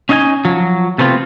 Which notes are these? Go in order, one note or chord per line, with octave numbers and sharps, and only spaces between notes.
C#4 D#4 D#5 F5 G#5
F3 F#3
C3 A3 B3 C4 D#4 F4